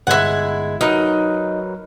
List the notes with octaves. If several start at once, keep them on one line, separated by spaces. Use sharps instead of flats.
G1 G#3 E4 F#5 G#6
F#3 D#4 A#4 B4